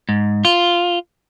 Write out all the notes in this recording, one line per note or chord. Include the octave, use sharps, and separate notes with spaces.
G#2
F4